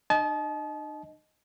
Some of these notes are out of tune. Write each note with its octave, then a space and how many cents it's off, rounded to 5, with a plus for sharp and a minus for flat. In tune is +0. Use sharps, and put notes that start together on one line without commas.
D#4 -45 D#5 +0 A5 -35